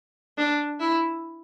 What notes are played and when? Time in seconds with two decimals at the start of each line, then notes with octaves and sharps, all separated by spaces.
0.38 D4
0.80 E4